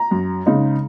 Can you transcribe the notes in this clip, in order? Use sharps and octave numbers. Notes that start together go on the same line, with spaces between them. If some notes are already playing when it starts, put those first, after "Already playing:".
Already playing: A#5
F#2
C#3 G#3 D#4